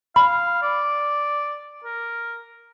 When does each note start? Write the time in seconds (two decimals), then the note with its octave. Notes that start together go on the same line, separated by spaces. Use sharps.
0.16 F5 B5
0.62 D5
1.85 A#4